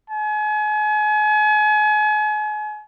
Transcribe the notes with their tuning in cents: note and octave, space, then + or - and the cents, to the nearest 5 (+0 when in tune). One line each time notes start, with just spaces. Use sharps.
G#5 +35